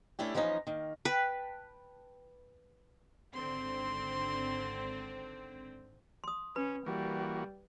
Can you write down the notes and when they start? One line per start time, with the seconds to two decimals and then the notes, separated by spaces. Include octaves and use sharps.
0.19 A3 C#4 D4 E4 G4
0.34 E3 F3 A#3 C#4 D#4
0.67 D#3 A#3
1.05 B4 G5 A5
3.34 G#1 D3 C4 C6
6.24 C6 D#6
6.56 C#4 B4 B5
6.86 E3 G3 A#3 F#4